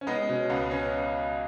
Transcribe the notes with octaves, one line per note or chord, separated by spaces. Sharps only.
C#4
G#3 B3 D#4
B2 C#4
C#2 B3
C#4